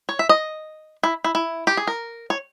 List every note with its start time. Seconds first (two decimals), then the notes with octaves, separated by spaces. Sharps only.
0.09 C#5
0.19 E5
0.29 D#5
1.03 E4
1.24 E4
1.35 E4
1.67 G4
1.77 G#4
1.87 A#4
2.30 C#5